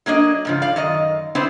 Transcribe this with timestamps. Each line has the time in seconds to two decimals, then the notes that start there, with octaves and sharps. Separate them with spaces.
0.06 F#3 A#3 D4 D#5
0.45 G#2 C#3 F3
0.62 D5 F5
0.76 F#2 D#3 D#5
1.35 B3 C4 D4 E4 C5